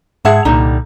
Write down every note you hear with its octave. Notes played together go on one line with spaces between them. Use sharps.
G#2 G#4 E5 F#5 A5 G#6
C2 A#2 D3 G3 D#4